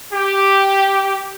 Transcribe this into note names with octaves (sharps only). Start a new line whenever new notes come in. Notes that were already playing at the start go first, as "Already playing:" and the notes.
G4